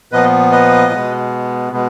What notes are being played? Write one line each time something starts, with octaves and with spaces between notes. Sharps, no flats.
A#2 F3 B3 B4 D#5
B4 D#5
B2 G#3 B3
B2 G#3 B3